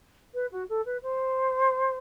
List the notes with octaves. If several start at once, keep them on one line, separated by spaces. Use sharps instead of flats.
B4
F#4
A4
B4
C5